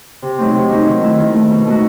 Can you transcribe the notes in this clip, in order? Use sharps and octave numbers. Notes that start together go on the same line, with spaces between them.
C3
F#3 A3 C4 D#4
C3
F#3 A3 C4 D#4
D#3
A3 E4
D#3
A3 E4
B2
A3 D#4 F#4